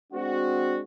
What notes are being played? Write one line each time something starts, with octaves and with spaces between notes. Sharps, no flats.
G#3 C4 D4 F#4